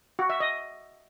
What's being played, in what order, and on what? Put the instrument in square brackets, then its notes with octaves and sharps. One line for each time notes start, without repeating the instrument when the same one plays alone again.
[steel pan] F#4
E5
D#5